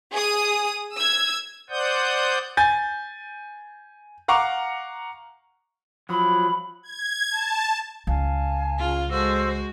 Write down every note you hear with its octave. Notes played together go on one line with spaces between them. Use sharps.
G#4 D#6
E6 G#6
C5 D5 F#5 D#6 G6
G#5 G6 A6
F5 F#5 A#5 C#6 D6
F3 F#3 B5
G#6
A5
C#2 F5 G#5 A5
C#3 F4
G#3 F#4 A4 C5 E6